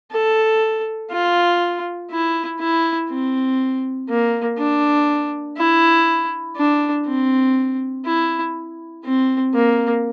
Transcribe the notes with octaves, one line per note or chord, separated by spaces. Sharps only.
A4
F4
E4
E4
C4
A#3
D4
E4
D4
C4
E4
C4
A#3